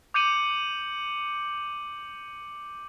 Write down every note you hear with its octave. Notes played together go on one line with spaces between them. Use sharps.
D6 G6 C#7 D#7 F#7